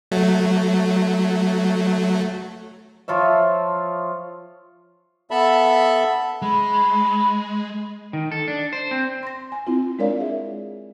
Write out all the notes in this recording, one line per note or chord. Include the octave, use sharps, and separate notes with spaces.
F#3 A3
F3 F4 C#5 E5
B3 A4 E5 A5 B5
G#3 B5
D#3
A4
D4
C5
C4
C6 A#6
G#5
C4 E4 F4
G#3 D4 A#4 C#5 D5 F5
G#4 E5